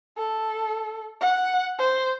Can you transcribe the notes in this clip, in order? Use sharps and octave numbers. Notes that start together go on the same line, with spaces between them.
A4
F#5
C5